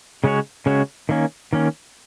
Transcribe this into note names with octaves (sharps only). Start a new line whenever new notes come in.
C#3 G#3 C#4 F#4 C#5
C#3 G#3 C#4 F#4 C#5
D#3 A#3 C#4
D#3 A#3 C#4